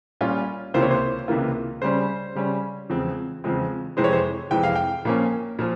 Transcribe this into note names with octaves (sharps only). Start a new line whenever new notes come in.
A#2 G3 C#4 F4
C#2 C3 E3 A#3 F4 C5
C#5
C5
C#2 C3 E3 A#3 F4
C#3 G3 C#4 C5
C#3 G3 C#4
E2 C#3 F3 G#3 C4
E2 C#3 F3 G#3 C4
F2 C3 E3 G#3 C5
C#5
C5
F2 C3 E3 G#3 G5
F5
G5
A#2 F3 A#3 C#4
A#2 F3